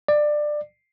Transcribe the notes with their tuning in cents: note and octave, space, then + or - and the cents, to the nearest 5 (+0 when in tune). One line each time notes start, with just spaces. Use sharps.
D5 +20